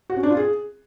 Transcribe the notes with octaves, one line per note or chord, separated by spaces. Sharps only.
F#4
C#4
D4
F4
G#4